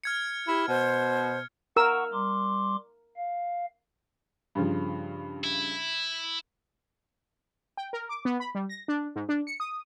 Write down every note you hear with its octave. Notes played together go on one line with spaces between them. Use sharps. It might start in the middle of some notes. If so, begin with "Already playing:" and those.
F6 G#6 C#7
E4 G4
B2 C5
A#4 F#5 C#6 E6
G3 C6 D6
F5
G2 C#3 F3
E4
G5
A#4
D6
B3
B5
G3
A#6
D4
G#2
D4
C#7
D#6